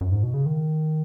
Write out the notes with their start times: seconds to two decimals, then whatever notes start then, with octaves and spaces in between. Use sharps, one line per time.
0.01 F#2
0.12 G#2
0.23 B2
0.34 C#3
0.45 D#3